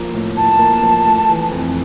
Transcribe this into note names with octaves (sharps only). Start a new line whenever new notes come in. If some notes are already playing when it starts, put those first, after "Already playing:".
Already playing: F3 A#3
A2
A2 A5
A#3
F3
A3
E3
F2